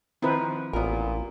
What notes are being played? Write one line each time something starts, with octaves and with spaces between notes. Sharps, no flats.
D#3 F3 C4 E4 F4 B4
A1 A#2 B3 A#4